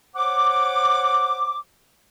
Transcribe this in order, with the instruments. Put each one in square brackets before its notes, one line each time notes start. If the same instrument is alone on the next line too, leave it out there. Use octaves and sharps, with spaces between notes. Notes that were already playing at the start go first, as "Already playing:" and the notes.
[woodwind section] C5 C#5 F#5 D6